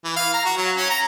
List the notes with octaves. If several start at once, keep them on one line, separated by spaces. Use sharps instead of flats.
E3
F5
A#5
F#4
F#3
C#4
A#5